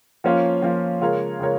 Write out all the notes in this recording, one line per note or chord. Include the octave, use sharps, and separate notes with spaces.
F3 A#3 C#4 F4
F3 A#3 C#4 F4
C#3 G#3 F4 A#4 C#5
C#3 G#3 F4 A#4 C#5